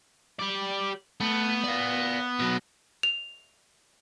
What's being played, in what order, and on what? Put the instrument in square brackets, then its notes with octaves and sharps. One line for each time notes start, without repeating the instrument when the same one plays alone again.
[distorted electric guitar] G4 D5
[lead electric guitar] A3 [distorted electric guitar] B3
[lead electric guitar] D5 F5
B2 F#3
[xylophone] F7